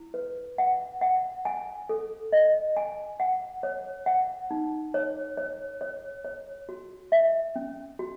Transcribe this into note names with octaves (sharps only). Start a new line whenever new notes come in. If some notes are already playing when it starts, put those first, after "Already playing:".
Already playing: E4
B4
F#5
F#5
G#5
A4
D#5
G#5
F#5
C#5
F#5
D#4
C#5
C#5
C#5
C#5
F#4
E5
C#4
F#4